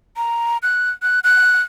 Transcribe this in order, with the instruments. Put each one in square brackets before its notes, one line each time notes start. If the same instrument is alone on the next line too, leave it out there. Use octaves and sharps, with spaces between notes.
[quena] A#5
F#6
F#6
F#6